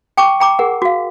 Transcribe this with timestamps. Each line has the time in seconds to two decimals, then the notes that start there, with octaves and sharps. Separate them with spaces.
0.17 G5 A5 C#6 D6
0.40 G5 A#5 D6
0.59 G#4 A#4 F#5
0.82 F#4 F5